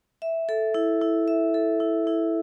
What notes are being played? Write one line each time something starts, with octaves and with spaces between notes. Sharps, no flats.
E5
A4
E4
E4
E5
A4
E4
E4